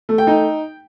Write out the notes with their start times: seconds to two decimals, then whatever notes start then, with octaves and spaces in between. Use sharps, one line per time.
0.09 A3
0.18 G5
0.27 D#4